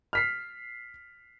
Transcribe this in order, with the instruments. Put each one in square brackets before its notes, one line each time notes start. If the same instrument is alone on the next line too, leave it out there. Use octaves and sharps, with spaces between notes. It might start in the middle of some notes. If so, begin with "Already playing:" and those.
[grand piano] F6 B6 C7